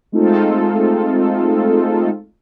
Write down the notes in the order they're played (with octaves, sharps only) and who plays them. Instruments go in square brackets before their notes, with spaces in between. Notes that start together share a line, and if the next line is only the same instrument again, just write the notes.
[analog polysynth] G#3 A3 C4 D#4 F4 A4